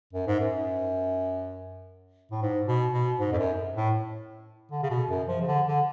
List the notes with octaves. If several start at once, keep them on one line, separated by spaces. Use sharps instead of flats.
F#2
G#2
F#2
A2
G#2
B2
B2
G#2
F2
F#2
A2
D3
C#3
B2
F#2
F3
C#3
D3
D3